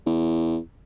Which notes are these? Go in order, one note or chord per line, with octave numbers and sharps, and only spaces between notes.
E2